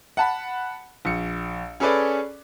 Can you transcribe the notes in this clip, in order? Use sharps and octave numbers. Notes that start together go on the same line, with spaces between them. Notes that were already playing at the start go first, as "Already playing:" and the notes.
F#5 A5 B5
A#1 C#7
C#4 G#4 A4 B4 D5